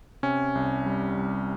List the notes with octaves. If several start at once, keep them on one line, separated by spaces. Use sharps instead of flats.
C3 C#4
C2
G3
C2